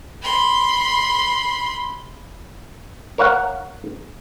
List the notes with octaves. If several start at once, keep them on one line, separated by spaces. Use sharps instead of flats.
B5 C6
A#4 C#5 F5 F#5